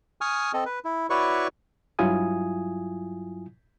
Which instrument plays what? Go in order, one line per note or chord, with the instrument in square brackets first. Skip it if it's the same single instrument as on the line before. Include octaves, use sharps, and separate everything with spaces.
[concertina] G#5 C#6 D#6 F6
C4 A4 D#5
B4
E4
E4 F#4 B4 C#5 D5 C#6
[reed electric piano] G2 F#3 E4 F4 G#5 D#6